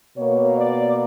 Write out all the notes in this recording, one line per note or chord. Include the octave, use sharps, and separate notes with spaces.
B2 A#3 C#5
D5